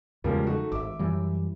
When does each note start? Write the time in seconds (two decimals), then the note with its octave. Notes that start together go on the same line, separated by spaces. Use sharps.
0.24 E2 C#3 F3 G3 G#3 A#3
0.47 A3 D#4 F#4
0.72 G#1 E5 D6
0.99 F#2 E3 G3